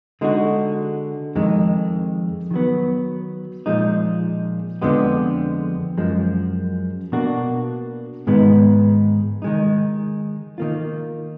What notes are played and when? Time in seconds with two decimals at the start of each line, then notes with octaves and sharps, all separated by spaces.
0.21 D3 G#3 D#4 F#4
1.35 F2 D#3 G#3
2.51 D#3 F#3 B3
3.66 A#2 F3 G#3 D#4
4.82 F2 D3 F3 G#3 B3
5.97 F#2 F3 G#3
7.12 B2 A#3 D4 F#4
8.27 G#2 D#3 G#3 B3
9.42 D#3 G#3 D#4
10.58 D#3 A#3 F4